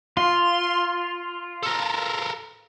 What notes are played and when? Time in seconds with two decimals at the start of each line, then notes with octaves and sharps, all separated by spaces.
0.17 F4 C6
1.63 A4 A#4